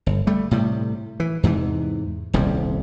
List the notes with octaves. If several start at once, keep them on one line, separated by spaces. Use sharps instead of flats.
G1
G3 A3
A2 C3 G3
E3
E2 G#2 C3 E3
D#1 C2 F2 G3